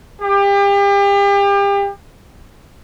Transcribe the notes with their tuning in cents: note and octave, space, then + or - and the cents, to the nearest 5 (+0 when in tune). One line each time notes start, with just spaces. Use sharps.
G4 +35